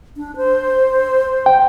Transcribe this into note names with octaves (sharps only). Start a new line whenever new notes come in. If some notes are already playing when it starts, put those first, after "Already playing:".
D4
C5
G5